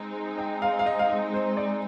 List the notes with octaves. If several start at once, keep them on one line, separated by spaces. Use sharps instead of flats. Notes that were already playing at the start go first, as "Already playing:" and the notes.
Already playing: G#3 C4 D#4
G5
F5
F5
D#5
F5
D#5
C5
D5